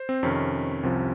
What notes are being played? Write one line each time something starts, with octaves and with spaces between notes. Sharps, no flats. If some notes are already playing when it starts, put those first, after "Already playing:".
Already playing: C5
C4
F2 C3 D#3 C#4
C2 C3 F3